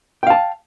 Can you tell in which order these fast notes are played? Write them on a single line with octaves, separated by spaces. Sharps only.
G5 F5 A5